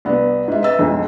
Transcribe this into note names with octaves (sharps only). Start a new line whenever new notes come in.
C2 B3
G#2 E5
B4 D#5 E5 E6 A6
B1 F2 G#2